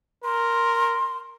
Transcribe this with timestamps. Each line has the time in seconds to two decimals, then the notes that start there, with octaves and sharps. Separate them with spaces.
0.24 A#4 C6